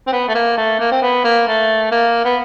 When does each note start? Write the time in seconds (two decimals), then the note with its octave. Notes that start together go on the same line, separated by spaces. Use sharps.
0.07 C4
0.12 B3
0.28 A3
0.35 A#3
0.57 A3
0.80 A#3
0.92 C4
1.02 B3
1.24 A#3
1.47 A3
1.92 A#3
2.25 B3